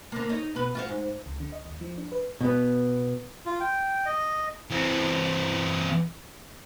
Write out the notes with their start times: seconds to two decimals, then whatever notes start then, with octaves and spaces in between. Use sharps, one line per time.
0.12 D3 A#3
0.29 D#4 C#5
0.55 B2 B4
0.75 F4 F#4 C5
0.88 G#2
1.26 C#2
1.40 D3
1.52 D#5
1.65 D#2
1.81 F3
1.98 D4
2.12 B4
2.41 B2 B3
3.46 F4
3.60 G5
4.06 D#5
4.71 E3 C4